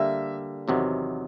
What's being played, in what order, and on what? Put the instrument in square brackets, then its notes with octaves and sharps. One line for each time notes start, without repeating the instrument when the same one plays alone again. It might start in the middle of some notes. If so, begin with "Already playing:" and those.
Already playing: [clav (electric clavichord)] D3 G3 A#3 [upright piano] E5
[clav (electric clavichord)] E2 C3 D#3 F#3 B3